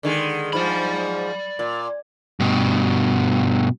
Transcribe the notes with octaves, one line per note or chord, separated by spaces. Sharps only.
D3 D#3 G#3
G#2 F3 D5 B5
A#2
G2 B2